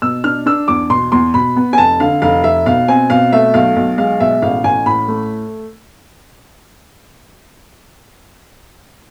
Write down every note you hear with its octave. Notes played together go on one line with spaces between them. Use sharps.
B2 E6
D4 F6
D4 E6
E2 D6
B2 C6
E2 C6
B2 B5
B3
G#5
F1 A5
D3 F5
F1 F5
F1 E5
B2 F5
C4 G#5
B2 F5
A3 E5
B1 F5
B1
G#3 F5
B2 E5
A1 F5
A1 G#5
A2 B5
A3